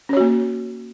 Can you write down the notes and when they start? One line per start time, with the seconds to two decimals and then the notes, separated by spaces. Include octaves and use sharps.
0.09 C#4
0.13 C#5
0.17 F#4
0.20 A#3